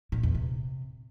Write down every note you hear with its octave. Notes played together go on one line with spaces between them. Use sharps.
A#2
E2
C3